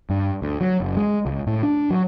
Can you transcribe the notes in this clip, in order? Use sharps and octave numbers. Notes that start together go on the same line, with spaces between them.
G2
D2
F#3
F#1
G#3
C#2
A2
D4
F#3